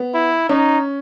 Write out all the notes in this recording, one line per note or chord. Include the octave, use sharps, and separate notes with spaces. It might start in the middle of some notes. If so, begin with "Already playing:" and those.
Already playing: B3
E4
C#4 D#4